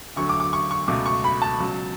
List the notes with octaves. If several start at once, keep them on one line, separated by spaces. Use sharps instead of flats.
D2 D3 F#3 A3 C#6
D6
D6
C#6
C#6
C#2 B2 A3 D6
C#6
B5
A5
C#2 B2 F#3